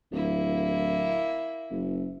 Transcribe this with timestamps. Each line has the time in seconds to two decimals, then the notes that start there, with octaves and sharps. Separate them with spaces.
0.12 D1 A#3 E4
1.70 F#1